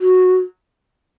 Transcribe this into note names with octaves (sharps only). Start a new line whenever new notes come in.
F#4